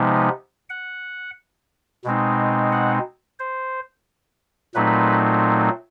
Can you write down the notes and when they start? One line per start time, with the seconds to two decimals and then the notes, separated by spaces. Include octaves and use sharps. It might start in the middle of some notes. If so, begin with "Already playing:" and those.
Already playing: C3 F3 G#3 B3 D#4
0.70 F#5
2.05 B2 G#3 C4 D#4
2.72 F#5
3.40 C5
4.75 A#2 F#3 A3 C4 D#4 B4